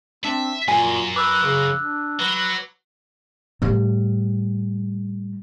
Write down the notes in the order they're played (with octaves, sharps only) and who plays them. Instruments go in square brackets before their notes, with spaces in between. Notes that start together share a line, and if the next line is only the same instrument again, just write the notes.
[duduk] C4 [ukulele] D4 [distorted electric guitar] E5
[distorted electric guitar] F#2 [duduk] A#2 [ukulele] G#5
[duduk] B4 [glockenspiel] D6 E6 F#6
[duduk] C#3
D4
[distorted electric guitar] F#3 [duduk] B4
[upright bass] A2 G3